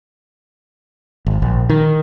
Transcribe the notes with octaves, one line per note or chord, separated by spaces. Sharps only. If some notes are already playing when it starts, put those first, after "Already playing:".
G#1
A#1
D#3